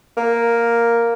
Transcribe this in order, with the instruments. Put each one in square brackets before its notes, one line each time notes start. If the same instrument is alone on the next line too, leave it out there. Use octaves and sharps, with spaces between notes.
[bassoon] A#3